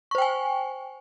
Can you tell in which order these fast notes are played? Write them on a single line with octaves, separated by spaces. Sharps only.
C#6 C5 G5 G#5